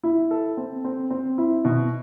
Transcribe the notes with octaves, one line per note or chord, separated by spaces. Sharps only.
E4
A4
C4
C4
C4
E4
B2